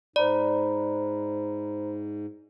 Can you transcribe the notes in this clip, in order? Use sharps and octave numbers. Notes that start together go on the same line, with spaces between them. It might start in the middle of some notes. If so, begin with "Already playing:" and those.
G#2 C5 D5 A#5 B5